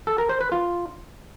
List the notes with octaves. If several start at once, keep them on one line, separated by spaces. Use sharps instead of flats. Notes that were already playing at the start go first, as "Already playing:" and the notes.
A4
A#4
C5
B4
F4